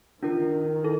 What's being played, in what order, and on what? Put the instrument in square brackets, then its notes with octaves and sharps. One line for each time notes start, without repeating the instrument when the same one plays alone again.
[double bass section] D#3 [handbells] D4 F4 A#4
[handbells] E4 A4